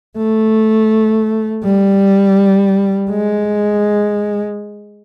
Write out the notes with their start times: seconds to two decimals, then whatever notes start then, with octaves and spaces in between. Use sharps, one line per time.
0.17 A3
1.64 G3
3.10 G#3